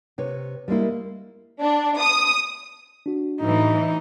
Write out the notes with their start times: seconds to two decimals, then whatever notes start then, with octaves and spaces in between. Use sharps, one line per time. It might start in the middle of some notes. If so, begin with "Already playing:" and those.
0.18 C3 B4 C#5
0.68 G3 G#3 A#3 E4
1.61 D4
2.00 D#6
3.06 D4 F#4
3.41 A2 E3 D#4